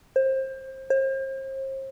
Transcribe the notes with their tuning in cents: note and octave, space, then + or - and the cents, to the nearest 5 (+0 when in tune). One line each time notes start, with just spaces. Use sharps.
C5 +25
C5 +40